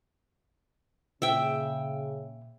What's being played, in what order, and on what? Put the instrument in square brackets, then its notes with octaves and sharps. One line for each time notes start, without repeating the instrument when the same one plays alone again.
[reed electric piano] A#2 [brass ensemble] C#3 [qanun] E5 G5